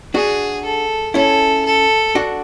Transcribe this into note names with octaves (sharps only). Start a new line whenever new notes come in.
D4 F#4 G#4
A4
C#4 E4 A4
A4
D4 F#4